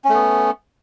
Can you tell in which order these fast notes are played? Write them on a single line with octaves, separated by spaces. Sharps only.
C#4 A3 B3